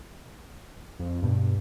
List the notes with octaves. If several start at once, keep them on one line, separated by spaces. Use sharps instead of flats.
F2
E1 G2 B2